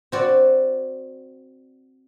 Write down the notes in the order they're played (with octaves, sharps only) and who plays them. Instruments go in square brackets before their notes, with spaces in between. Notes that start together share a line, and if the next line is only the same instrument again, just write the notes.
[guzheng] C4 F#4 D5